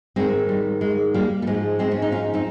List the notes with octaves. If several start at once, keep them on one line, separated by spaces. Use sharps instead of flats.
G#2 D#3 G#3 C4
G3
G#3
G3 A#3
G3
G#2 F3 G#3
G#3 C4
C#4
D#4
C#4 F4
C4 D#4